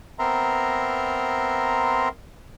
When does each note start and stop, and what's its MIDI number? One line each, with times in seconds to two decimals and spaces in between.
0.19 2.09 59
0.19 2.09 60
0.19 2.09 70
0.19 2.09 76
0.19 2.09 82
0.19 2.09 84